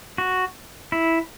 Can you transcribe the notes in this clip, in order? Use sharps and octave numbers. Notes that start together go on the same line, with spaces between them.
F#4
E4